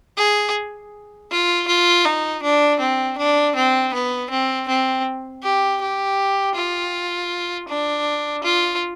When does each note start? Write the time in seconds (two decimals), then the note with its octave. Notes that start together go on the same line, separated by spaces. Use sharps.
0.17 G#4
1.30 F4
1.68 F4
2.05 D#4
2.43 D4
2.80 C4
3.18 D4
3.56 C4
3.94 B3
4.30 C4
4.68 C4
5.43 G4
5.81 G4
6.56 F4
7.68 D4
8.44 F4